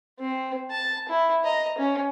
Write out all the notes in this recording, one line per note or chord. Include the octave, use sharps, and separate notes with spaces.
C4
A5
E4
D#5 A#5
C#4